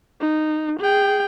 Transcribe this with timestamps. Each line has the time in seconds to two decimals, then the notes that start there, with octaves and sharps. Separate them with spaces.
0.21 D#4
0.80 G#4 G5